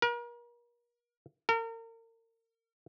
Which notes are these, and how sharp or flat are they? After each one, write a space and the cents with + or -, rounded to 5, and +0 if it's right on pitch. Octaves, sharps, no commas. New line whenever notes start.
A#4 +40
A#4 -35